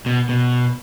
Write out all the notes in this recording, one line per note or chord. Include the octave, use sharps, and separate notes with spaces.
B2
B2